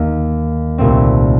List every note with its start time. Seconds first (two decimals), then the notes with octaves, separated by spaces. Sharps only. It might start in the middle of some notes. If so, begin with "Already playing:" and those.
Already playing: D#2 D#3 A#3 D#4
0.78 C2 A#2 A3 C4